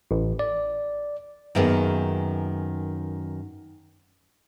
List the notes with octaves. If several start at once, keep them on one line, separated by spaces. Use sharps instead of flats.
A1
D5
F#2 D#3 A#3 B3 G#4